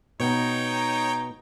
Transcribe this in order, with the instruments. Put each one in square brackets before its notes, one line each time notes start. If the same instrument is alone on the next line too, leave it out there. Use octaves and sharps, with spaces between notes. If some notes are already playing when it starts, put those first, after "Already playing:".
[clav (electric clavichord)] B2 B3 [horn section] D#4 [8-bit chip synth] C#5 G5